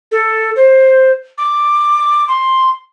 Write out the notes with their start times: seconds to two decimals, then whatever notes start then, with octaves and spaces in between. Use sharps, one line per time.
0.12 A4
0.56 C5
1.38 D6
2.28 C6